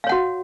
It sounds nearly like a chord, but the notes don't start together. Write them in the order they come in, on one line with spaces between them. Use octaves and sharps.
F5 C#5 F#5 F#4